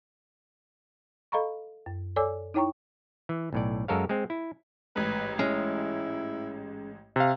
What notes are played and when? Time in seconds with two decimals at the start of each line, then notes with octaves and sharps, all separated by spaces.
1.32 A4 D#5 F5 A#5 B5 C#6
1.86 F#2
2.16 A4 C#5 D5 G#5 D6 E6
2.54 D#4 E4 C#5 G5 A#5 C#6
3.29 E3
3.53 B1 A2 D5
3.88 F#2 G#3 A4 A#4 C#5 F5
4.09 G#3 C4
4.30 E4
4.96 A1 G#2 B4
5.39 G#3 C#4 E4
7.16 C3 F5